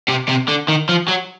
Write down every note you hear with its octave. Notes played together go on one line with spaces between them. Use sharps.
C3
C3
D3
D#3
F3
F#3